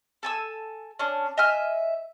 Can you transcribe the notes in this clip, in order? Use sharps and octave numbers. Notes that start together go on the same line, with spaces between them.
A4 G#5 E6
C#4 D4
D#5 E5 G#5 F6